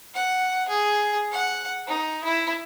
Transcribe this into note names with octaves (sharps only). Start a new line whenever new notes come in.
F#5
G#4
F#5
D#4
E4